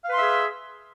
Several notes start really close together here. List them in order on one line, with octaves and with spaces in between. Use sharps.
F5 B4 C6 E5 G#4